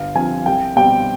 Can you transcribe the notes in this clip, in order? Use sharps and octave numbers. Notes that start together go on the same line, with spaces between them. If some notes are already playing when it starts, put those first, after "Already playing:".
Already playing: G1 F5
G2 F3 C4 G#5
C2 G5
B2 G3 C4 G5